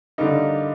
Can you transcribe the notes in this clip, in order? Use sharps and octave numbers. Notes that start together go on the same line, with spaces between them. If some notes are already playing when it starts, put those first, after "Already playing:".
D3 G3 A#3 D#4